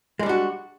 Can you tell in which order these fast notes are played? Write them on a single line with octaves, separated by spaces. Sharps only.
G#3 G3 D4 F#4